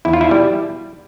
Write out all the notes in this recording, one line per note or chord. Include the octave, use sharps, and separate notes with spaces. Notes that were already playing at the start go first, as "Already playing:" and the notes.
E2 E4
F4
E4
B2 G3